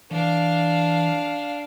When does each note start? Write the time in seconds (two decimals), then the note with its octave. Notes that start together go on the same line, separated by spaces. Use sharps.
0.11 E3 D4 F5